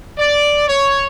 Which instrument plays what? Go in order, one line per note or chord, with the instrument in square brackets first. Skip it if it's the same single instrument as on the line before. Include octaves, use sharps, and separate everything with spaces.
[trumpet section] D5
C#5